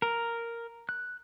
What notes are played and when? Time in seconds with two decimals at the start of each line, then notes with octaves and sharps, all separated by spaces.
0.02 A#4
0.89 F#6